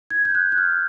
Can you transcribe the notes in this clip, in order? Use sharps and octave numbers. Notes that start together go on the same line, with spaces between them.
G#6
G6
F#6
F#6
F6